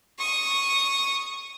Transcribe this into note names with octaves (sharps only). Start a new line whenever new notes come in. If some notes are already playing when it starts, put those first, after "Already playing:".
C#6 D#6